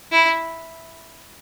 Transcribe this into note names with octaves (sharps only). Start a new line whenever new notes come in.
E4